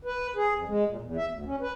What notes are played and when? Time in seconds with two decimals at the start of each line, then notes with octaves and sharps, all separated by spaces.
0.05 B4
0.36 G#4
0.55 F2
0.68 G#3
0.87 A#2
1.01 E2
1.17 E5
1.31 D2
1.46 C#4
1.61 B4